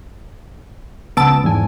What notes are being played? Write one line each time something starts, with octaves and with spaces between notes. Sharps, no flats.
C#2 B3 A5 E6 D7
E2 G#2 G#5